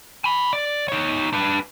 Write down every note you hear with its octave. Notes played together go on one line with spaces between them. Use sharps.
G#5 B5
D5
D#4 C#5
D4 B4